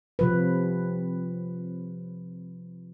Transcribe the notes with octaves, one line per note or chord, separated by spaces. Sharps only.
C3 F3 B4